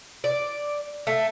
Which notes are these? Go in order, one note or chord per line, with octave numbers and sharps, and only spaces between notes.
D5
A3